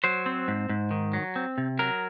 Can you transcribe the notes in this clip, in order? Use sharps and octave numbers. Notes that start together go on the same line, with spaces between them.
F#3 C5
C4
G#2
G#2
D#3
F#3
C4
C3
F#3 A#4